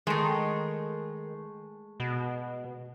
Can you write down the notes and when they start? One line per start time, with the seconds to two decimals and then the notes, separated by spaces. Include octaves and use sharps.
0.07 D#3 G#3 A3
2.00 B2